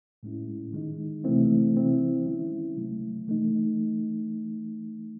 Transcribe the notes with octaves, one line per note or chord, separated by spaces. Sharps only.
A2 G#3 C#4 E4
D#3 G#3 D#4
C3 E3 A3 C4 E4
E3 C4 E4
D#3 G#3 C#4 E4
C3 F#3 A3
E3 A3 D#4